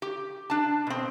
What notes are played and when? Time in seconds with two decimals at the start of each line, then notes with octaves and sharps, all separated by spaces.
0.02 G4
0.50 D4 A5
0.87 B2 C4